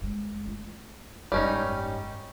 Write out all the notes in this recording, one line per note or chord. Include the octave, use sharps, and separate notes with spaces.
F#1 G#3
A3 F4
F#1 G#2 G3 C#4 D#4